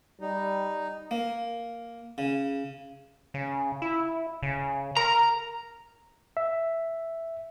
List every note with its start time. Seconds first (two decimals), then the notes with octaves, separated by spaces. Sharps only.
0.21 G3 D#4
1.11 A#3
2.18 C#3
3.34 C#3
3.82 E4
4.43 C#3
4.97 A#4 A#5
6.37 E5